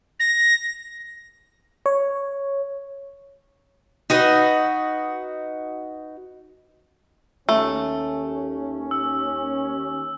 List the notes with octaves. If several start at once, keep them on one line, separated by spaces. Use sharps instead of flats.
A#6
C#5
D#4 F#4 B4
D#2 A3 C#4
E6